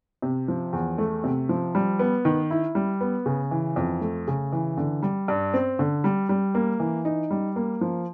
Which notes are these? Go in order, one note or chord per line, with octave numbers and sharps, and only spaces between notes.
C3
F3
E2
A3
C3
F3
G3
B3
D#3
E4
G3
B3
C#3
E3
F2
A3
C#3
E3
D3
G3
G2
C4
D3
G3
G3
A#3
E3
D#4
G3
A#3
F3